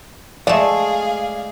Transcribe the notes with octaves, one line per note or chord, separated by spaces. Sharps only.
G#3 A3 G#4 D5 F5